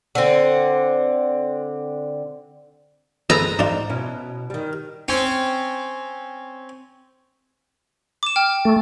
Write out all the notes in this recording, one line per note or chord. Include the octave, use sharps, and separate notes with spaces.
D3 C4
G2 G#3 A4 B4 D#5 A#5
G#2 D4 F4
B2 C#4 E4
D#3 G3
C4 C#4
D6 E7
G5 F6
A3